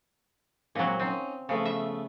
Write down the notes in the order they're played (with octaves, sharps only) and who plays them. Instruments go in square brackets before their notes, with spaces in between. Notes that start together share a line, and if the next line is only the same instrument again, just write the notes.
[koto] A#2 F#3 [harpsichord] G#3 C4
[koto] C4 [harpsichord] C#4 D#4
[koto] C#3 [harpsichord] F3 A3 B3
[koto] E5